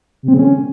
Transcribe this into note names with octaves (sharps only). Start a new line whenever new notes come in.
C3
C4
C#3
C#4